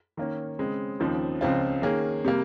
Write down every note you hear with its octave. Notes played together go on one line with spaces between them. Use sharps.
D#3 A#3 C#4
C#3 G#3 C4
D#2 C#3 F3 C4 D#4
C#2 C#3 F3 C4 F4
D#3 A#3 C#4 G#4
C3 G3 A#3